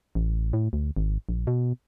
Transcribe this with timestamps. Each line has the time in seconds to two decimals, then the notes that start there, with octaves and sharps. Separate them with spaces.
0.15 A1
0.53 A2
0.73 D2
0.97 G#1
1.29 A#1
1.47 B2